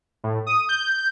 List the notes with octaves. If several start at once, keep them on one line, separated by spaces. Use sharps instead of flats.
A2
D#6
G6